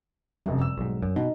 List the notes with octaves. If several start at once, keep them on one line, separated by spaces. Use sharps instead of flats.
F1 F#2 G3
E6
B1 G#2
F#2
B2 D#4